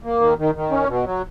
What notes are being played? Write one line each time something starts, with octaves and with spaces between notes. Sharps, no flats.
A#3
D#3
D#3
D#3
C#4
B2
F#3